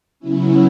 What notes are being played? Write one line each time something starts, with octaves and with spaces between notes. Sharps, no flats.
C#3 F#3 B3 C#4 E4